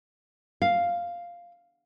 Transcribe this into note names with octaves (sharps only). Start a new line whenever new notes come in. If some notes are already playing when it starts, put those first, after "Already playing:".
F5